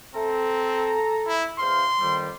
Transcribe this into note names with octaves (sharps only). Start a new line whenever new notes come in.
C4 A4 A#5
E4
E2 C5 F5 C6
F2 D#3 G3